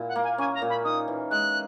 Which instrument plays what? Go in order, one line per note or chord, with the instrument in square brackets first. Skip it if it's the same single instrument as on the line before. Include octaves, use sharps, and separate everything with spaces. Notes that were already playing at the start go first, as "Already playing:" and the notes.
Already playing: [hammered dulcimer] A#2 E4
[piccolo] F#5
[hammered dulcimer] A#3
[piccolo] G#5
[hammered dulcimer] C#4 [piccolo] G#5
[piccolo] A#5
[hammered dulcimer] A#2
[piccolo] B5
[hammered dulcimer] D#4 [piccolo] D#6
[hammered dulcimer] E3
[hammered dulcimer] G#3 [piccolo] F#6